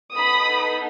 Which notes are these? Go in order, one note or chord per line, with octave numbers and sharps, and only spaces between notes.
B3 D#4 A4 B5 D#6